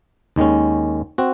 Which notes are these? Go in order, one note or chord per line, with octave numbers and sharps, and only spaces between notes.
D#2 D#3 G#3 C#4
C4 F#4